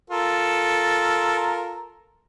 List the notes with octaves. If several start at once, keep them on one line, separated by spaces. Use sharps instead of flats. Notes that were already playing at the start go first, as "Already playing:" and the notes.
F4 A4 A#4